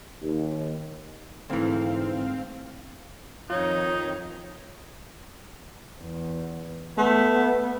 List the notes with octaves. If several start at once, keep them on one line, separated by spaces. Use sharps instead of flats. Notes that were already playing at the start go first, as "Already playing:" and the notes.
D#2
D2 G#2 E3 C4 F5
F2 D#3 D#4 F4 C#5
E2
A3 B3